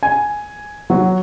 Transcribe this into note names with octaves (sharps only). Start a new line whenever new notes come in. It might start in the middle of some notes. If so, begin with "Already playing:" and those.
G#5
F#3